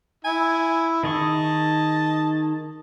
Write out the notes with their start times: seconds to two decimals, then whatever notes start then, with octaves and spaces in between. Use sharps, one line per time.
0.25 E4 G#5
1.03 D#3 G#4 D#5 A5 C#6